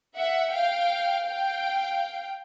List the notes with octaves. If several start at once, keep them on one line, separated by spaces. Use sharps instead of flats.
E5 F#5
F5 G5
F5 G5